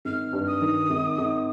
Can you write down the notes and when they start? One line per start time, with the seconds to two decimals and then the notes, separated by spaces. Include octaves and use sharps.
0.05 G#1 F6
0.33 G2
0.47 D#6
0.61 D#3
0.90 G#1
1.18 G#1